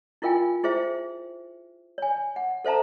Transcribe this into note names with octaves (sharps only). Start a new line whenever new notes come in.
E4 F4 A#4 F5 G5 G#5
E4 G#4 C5 E5
C#5 G#5
F#5
A4 C5 E5 A5 A#5